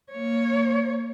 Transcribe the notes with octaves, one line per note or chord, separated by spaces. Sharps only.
A#3 C#5